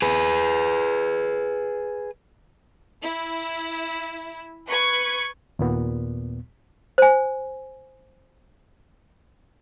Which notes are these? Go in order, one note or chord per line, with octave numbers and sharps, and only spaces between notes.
G#4 B4
E4
B4 C#6 G#6
D#2 A#2 B3
C5 G#5